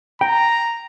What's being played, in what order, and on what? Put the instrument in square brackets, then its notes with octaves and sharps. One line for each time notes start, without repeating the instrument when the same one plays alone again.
[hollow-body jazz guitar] G5 [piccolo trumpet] A#5